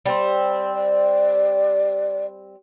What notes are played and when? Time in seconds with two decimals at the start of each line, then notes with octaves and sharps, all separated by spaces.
0.06 G3 C4
0.74 D5